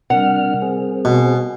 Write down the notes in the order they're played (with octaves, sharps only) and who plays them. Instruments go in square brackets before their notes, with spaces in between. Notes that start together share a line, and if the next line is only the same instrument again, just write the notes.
[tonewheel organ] C3 D4 F6 [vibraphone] G3 A#4 [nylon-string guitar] F#5
[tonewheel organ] C4 G#4
[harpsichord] B2